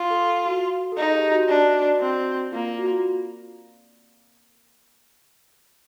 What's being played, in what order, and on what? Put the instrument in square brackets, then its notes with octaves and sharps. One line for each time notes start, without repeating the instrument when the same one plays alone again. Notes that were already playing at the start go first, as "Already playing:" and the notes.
Already playing: [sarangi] F4
[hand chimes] A4
F#4
A4
[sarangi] D#4 [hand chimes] G#4
[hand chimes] G4
F#4
[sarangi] D4
C4
[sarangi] A#3 [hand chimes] F4
[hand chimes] F#4
F4